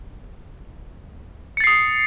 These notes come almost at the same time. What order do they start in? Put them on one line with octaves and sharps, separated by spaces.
C#7 A6 C7 D#6